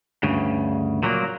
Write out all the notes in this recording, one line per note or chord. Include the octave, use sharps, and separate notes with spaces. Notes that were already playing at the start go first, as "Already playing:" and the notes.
D2 G2 C#3
A#2 F#3 G#3 A#3